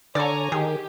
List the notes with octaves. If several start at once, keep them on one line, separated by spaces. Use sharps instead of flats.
D3 A4 C#5 D5 G#5 A#5
D#3 G4 G#4